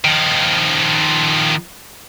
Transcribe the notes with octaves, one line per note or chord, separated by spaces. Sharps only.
D#3 F3